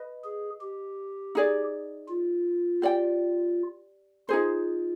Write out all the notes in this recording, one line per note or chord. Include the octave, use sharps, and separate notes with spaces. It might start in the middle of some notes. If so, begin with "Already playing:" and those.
Already playing: B4 D#5
G#4
G4
D#4 G#4 D5
F4
G4 D5 G5
D#4 F4 G#4 C5